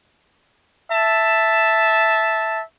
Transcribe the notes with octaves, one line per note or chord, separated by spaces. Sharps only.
E5 A5